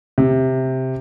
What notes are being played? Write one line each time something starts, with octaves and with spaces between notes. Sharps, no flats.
C3